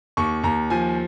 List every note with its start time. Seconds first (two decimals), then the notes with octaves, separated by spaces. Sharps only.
0.17 D#2 C#6
0.44 D#2 A#5
0.70 F3 G#5